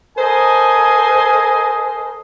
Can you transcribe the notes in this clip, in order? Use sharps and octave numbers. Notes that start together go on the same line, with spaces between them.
A4 A#4 C5 D#5 G#5